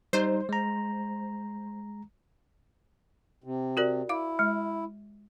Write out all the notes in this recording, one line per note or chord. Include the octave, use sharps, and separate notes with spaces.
G3 D#4 C5
G#3 A#5
C3
F#4 A#4 D5
E4 F5 D6
G#3